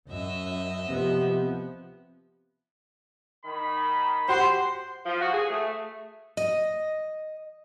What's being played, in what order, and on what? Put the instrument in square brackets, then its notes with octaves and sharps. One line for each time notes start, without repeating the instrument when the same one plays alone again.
[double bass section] F#2 [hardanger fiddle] D#5 E5
[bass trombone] C3 [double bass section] F3 B3
[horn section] D#3 B5
[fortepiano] F#4 G4 F#5 [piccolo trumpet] C5 [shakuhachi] C6
[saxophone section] F3
F#4
G#4
A3
[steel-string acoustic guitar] D#5